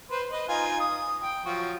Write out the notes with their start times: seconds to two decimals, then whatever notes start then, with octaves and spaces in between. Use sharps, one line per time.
0.11 B4 C5
0.32 B4 D#5
0.49 D#4 F4 G#5
0.80 D#6
1.22 G5
1.45 F3 F#3 F#4